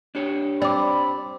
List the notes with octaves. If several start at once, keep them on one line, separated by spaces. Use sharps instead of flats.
D4 G4 C#5
C4 D5 B5 D6